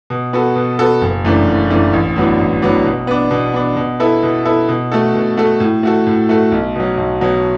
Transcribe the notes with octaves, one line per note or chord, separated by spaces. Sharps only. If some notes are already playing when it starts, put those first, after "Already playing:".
B2
B3 F#4 A4
B2
B3 F#4 A4
F#1
F#2 E3 A3 D4
F#1
F#2 E3 A3 D4
A1
A2 F#3 B3 D4
A1
A2 F#3 B3 D4
B2
B3 D4
B2
B3 D4
B2
B3 E4 A4
B2
B3 E4 A4
B2
A3 F#4 A4
B2
A3 F#4 A4
A2
A3 F#4 A4
A2
A3 F#4 A4
B1
B2 F#3
B1
B2 F#3